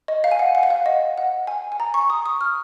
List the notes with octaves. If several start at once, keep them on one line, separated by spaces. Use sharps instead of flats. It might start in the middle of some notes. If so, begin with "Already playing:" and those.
D#5
F5
G#5
F#5
F#5
F5
F#5
D#5
F#5
G#5
G#5
A#5
C#6
D#6
D#6
F6